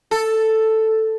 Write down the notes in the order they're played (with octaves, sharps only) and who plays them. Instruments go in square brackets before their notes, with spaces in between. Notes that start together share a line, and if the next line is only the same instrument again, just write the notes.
[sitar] A4